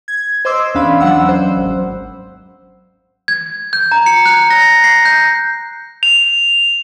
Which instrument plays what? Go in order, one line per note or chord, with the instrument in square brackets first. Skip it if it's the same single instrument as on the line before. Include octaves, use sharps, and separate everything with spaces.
[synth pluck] G#6
C5 D#5 C6 D6 E6
E2 C#4 D4 F5 B5
F#3 D4 F#5 E6
C5
G#1
[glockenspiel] G#6
G6
A#5
C#7
F#6
A#6
C7
G6
[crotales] F7